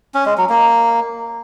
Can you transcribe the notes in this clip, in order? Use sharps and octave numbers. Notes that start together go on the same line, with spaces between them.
C#4
G#3
F#3
A#3